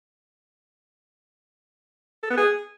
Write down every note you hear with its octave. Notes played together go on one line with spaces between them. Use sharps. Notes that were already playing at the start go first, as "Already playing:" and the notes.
A4
B3
G#4